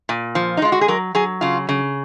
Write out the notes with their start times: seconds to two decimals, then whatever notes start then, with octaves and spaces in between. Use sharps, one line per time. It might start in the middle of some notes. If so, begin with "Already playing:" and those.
0.09 A#2
0.35 F3
0.57 D#4
0.62 G#3 F4
0.72 F#4
0.81 G#4
0.88 F#3 A#4
1.15 F#3 G#4
1.41 C#3 F4
1.69 C#3